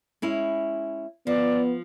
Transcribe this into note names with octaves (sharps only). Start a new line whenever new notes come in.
G#3 C#4 E4
F3 B3 D5